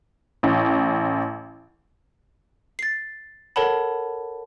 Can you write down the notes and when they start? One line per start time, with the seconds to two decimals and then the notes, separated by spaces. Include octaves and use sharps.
0.43 A1
2.79 A6 C7
3.56 A4 A#4 C#5 F#5 A5 B5